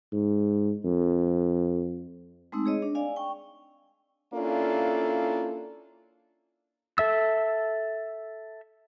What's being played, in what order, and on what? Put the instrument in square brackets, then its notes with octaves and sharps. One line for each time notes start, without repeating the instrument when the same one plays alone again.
[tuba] G#2
F2
[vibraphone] G#3 A3 C4 D#4 E6
G#4 C#5 D#5
D4
D5 F5 G#5
G5 C#6
[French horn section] A#3 C#4 D4 E4 F4 A4
[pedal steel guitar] A4 E5 E6